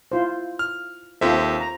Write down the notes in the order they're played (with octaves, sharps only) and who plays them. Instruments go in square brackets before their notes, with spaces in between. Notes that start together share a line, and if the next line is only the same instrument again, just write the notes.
[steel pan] E4 F4 C5
[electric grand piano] F6
[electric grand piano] D#2 A4 E5 [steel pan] C4 F4 C5
[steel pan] A#5